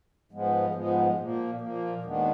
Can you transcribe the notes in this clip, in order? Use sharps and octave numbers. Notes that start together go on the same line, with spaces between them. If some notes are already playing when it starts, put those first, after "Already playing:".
G#2 F3 G#3 B3
G#2 F3 G#3 B3
A#2 F3 A#3
A#2 F3 A#3
D#2 D#3 G#3 B3 D4